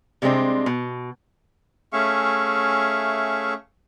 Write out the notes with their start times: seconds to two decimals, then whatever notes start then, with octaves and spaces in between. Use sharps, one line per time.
0.22 C3 G3 G#3 C4 D4
0.66 B2
1.93 A3 C#4 G#4 E5 F5 C#6